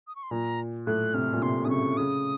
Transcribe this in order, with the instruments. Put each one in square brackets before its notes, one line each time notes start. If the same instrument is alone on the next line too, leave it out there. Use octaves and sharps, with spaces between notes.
[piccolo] D#6
C#6
C6
[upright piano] A#2 [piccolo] A#5
[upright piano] A2 [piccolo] F#6
[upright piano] C3 [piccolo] F6
[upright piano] A#2
[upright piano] C3 [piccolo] C6
[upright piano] C3 [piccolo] D#6
[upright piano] C#3 [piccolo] C#6
[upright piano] C#3 [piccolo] D#6